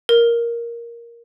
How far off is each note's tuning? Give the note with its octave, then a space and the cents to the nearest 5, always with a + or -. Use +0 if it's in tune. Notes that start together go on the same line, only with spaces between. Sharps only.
A#4 +5